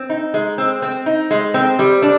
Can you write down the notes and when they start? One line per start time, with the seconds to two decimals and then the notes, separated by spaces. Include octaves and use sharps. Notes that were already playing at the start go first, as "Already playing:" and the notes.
Already playing: C4
0.09 D#4
0.34 G#3
0.58 C4
0.82 C4
1.06 D#4
1.31 G#3
1.54 C4
1.79 G3
2.02 D4